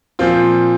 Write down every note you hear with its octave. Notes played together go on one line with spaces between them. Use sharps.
A#2 F3 C4 F4